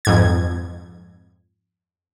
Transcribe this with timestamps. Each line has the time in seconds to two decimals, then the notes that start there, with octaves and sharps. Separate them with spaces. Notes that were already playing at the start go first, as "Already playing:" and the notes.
0.05 F2 G#2 G#6